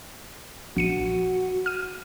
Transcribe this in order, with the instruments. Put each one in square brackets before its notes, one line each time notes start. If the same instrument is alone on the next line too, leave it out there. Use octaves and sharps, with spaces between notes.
[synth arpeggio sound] A#1 C#7 D#7 [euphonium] F#4
[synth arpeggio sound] F6 D#7